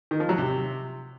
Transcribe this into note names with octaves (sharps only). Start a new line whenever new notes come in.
D#3
F3
F#3
C3